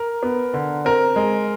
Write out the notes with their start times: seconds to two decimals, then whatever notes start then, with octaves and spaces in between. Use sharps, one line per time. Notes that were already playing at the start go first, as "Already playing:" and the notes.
Already playing: A#4
0.23 B3
0.54 D3
0.85 C4 A#4
1.16 G#3